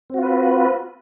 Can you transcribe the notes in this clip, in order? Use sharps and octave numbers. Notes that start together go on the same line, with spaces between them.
C4 F4 F#4 B4